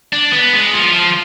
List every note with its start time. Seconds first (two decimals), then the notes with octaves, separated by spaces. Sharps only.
0.13 D4
0.33 B3
0.53 G#3
0.73 F3
0.94 F3